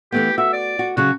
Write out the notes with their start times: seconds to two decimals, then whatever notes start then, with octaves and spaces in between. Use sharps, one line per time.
0.12 E3 A3 B3 G4
0.38 F#4 E5
0.53 D5
0.79 F#4
0.97 C#3 F#3 F#4 G#4